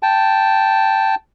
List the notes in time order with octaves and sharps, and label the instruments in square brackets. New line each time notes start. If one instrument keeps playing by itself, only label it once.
[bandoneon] G5 A5